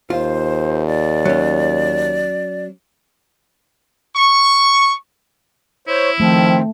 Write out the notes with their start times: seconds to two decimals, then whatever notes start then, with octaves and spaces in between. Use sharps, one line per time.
0.10 D#2 F4 C5
0.87 D5
1.25 F#3 C#4
4.16 C#6
5.88 E4 C5 C#5
6.20 D#3 F3 A3 C4